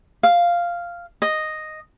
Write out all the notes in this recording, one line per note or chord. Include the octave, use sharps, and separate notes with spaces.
F5
D#5